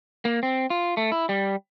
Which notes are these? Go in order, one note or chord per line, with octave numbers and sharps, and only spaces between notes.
A#3
C4
F4
A3
E4
G3